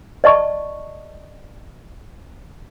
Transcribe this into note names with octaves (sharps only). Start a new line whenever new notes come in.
D5 D#5 A5 C#6